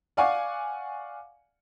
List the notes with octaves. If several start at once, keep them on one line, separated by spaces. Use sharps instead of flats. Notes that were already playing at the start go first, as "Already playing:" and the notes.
D5 F5 F#5 G#5 C#6 D6